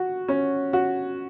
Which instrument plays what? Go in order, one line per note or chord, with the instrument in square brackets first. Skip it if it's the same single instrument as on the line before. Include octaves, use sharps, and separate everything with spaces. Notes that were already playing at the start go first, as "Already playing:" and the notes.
Already playing: [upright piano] F#4
C#4
F#4